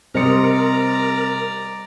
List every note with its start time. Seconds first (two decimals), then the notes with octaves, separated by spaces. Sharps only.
0.15 C3 G3 A#4 C5 D5 D#5 A#5 C#7